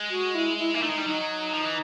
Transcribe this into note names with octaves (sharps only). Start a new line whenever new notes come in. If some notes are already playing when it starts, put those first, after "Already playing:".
Already playing: G#3
F#4
E4
E4
A#3 E4
A3 D#4
G#3
G3
F#3 D#4
F3
E3